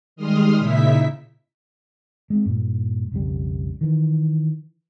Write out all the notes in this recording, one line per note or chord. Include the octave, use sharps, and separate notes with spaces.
D#3 G3 G#3 C6 D#6 F6
A#2 C#3 D#4 E4 E5 B6
G#3 C4
G2 A#2
B1 F2 C#3 G3
D#3 E3